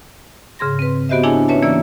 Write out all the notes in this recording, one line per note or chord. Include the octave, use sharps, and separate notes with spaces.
G#2 C#3 G#4 C6 A#6
C4 B4
B3 F#4 G4 C5 D#5 E5
D4 E4 G#4 C#5 G#5 A5
C#4 B4 C#5 E5 A5
E3 A#3 C#5 D5 E5 E6